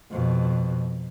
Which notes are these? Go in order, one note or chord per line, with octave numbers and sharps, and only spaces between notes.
F2 B2